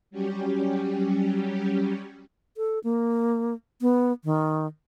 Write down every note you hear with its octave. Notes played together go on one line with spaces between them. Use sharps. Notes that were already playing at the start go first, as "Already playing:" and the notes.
F#3 G3 C#4 G4
A4
A#3
B3
D#3